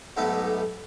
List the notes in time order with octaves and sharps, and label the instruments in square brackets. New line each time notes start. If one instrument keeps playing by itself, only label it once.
[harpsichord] B1 G#2 A3 B3 G4